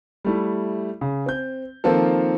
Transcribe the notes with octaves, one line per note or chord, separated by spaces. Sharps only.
G3 A3 E4
C#3
C4 G6
D#3 F3 A#3 C4 F4 A4